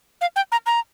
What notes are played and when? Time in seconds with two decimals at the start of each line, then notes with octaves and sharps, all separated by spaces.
0.21 F5
0.36 G5
0.52 A#5
0.66 A#5